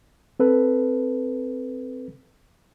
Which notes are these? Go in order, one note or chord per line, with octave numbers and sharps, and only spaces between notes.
C4 A4 B4